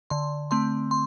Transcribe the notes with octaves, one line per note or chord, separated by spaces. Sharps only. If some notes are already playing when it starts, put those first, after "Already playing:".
D3 C6
A3 C4 C6
C6